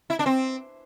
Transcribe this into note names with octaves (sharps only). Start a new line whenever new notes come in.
E4
D4
C4